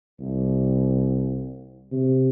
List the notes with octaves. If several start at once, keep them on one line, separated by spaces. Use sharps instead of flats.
C2
C3